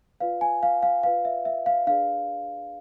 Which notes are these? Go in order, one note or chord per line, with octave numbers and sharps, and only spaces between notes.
F4 B4 D5 F5
G#5
F5
F5
F4 B4 D5 F5
E5
E5
F5
D4 G#4 B4 D5 F5